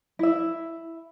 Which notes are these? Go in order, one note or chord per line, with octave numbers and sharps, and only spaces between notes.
E4 E5